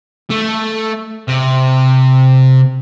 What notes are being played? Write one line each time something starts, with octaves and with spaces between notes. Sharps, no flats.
A3
C3